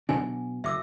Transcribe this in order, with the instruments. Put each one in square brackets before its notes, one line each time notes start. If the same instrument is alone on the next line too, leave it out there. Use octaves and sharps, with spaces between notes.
[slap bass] B2 F#3 D4 [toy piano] G#5
[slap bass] F#1 [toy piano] E5 D6 E6